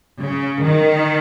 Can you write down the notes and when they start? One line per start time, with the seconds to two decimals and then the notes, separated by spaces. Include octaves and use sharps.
0.21 C#3
0.63 D#3